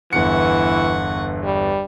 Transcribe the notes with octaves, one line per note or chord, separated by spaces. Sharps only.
G1 E2 E3 F#5 C#6 C#7
G3